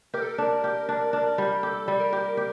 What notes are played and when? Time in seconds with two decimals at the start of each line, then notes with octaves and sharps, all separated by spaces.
0.14 G4 A#4
0.21 A4
0.29 A#4
0.38 D4
0.64 G4
0.89 D4
1.13 D4
1.38 G3
1.63 G4 A4
1.88 G3
2.00 A#4
2.13 G4
2.37 G4